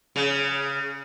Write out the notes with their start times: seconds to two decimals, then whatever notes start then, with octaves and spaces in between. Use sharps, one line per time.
0.16 C#3